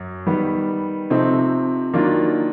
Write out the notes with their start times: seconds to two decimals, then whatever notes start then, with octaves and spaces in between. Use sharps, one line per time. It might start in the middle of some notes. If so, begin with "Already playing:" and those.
Already playing: F#2 F#3
0.27 D#3 G3 B3
1.10 C3 F3 A3 C4 D#4
1.93 D#3 F#3 A#3 D4 F4